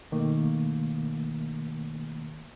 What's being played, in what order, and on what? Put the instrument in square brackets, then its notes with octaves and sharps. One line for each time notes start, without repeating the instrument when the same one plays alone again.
[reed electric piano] B2 D#3 A3 A#3